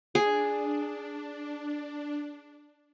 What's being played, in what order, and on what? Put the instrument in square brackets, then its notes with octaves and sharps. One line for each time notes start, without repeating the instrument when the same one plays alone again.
[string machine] D4 [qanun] G#4